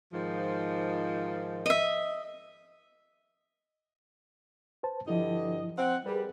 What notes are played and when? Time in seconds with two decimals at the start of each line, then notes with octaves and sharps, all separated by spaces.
0.13 G#2 D#3 F3
1.66 D#5 E5
4.83 B4 C5 A5
5.08 G2 D3 F3 E4 D#5
5.78 C4 F#5
6.06 G3 G#4 A#4 B4